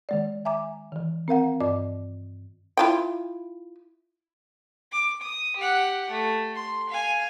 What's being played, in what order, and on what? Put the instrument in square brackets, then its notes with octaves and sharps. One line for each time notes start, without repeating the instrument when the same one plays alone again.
[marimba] D#3 G#3 D5
E5 G#5 A#5 D6
D#3 E3
C4 A#4 F5 F#5
G2 D5 D#5 D6
[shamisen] E4 F4 G5
[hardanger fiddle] D6
D#6
G4 F#5
A3
C6
F5 G#5